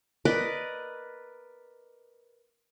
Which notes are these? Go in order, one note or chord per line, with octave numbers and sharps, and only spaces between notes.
A#4 B4 D5 D#5